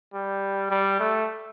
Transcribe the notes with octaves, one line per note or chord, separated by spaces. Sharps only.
G3
G3
A3